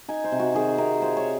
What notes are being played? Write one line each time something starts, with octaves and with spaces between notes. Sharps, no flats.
D#4 G#5
C5
C3
F#4
D#3 G#4
C3 A#4
F4 C5
C#5